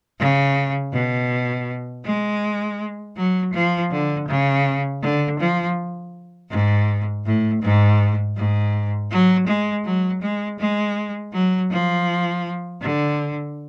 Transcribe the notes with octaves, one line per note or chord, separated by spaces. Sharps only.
C#3
B2
G#3
F#3
F3
D3
C#3
D3
F3
G#2
A2
G#2
G#2
F#3
G#3
F#3
G#3
G#3
F#3
F3
D3